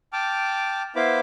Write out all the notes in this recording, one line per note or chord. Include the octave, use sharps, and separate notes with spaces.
G5 A5 D6 F6
B3 E4 C5 F5 B5 D6